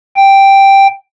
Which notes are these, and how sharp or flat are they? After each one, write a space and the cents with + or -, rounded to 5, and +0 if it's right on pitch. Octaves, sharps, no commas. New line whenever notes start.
G5 +0